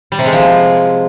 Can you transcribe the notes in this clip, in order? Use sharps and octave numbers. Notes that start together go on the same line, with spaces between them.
G3
C3
G#3
F3